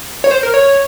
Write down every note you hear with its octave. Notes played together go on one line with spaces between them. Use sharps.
C#5
C5
A#4
C#5